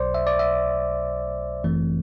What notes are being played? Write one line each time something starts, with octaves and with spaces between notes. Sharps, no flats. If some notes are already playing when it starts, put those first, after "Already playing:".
Already playing: B1 B2 F#3 C5 D5
E5
D5
E5
G1 F#2 E3 A3 C4